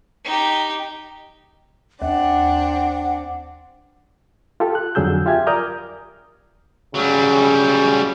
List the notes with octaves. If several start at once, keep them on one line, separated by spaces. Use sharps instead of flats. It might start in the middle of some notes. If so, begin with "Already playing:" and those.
D#4 G4
D#2 C4 D4 F#5
F4 G4 A4
F#6
F2 D3 F#3 G#4 E6 G6
F4 G4 E5 F5 G#5 G#6
A#4 D5 A#5 D#6 F6 G6
C#3 F#3 G3